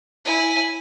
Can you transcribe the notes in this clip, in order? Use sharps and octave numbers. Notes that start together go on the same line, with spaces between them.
E4 G#5